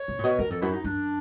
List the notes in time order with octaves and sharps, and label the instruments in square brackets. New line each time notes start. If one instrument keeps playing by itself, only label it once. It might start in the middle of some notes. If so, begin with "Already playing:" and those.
Already playing: [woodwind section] C#5
[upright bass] C3
A#2
B2
[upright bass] F#2 [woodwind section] A#4
[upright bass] F2 [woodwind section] A4
[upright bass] F#2 [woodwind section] E4
[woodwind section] D#4
[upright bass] F#2 [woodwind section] D4